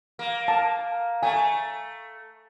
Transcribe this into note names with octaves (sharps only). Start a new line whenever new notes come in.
A#3
A5
A3 G#5